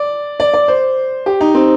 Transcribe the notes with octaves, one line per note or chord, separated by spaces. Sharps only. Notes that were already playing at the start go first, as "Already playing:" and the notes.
Already playing: D5
D5
D5
C5
G4
D#4
C4